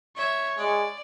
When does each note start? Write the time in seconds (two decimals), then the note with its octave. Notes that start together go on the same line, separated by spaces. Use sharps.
0.16 C#5 E5
0.58 G#3 D5